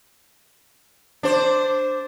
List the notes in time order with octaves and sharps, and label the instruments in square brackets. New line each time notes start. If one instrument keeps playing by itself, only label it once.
[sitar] D4 C5